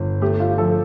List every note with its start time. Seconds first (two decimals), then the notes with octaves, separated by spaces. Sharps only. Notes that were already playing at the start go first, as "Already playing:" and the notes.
Already playing: G1
0.21 A3 G4
0.40 F4
0.58 F3 A4